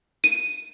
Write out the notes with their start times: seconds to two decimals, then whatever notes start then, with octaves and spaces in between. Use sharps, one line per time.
0.24 D#7